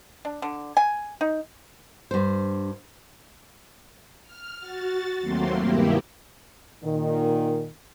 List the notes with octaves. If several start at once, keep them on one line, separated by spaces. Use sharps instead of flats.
D4
D3
G#5
D#4
G2 C5
F6
F#4 A6
D#2 F#3 A3 A#3 C4 C6
G2 B2 D#3 A#3 E4 G4
A#2 D#3